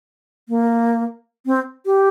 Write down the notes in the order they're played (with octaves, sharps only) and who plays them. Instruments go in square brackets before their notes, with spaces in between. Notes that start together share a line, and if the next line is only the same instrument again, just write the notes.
[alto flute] A#3
C4
G4